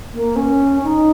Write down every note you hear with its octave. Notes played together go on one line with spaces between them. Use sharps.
A#3
C#4
D#4